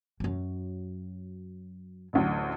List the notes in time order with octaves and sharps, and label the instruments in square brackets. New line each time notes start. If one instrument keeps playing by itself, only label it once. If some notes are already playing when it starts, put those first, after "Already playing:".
[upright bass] F#2 F#3
[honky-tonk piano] A1 D2 F#3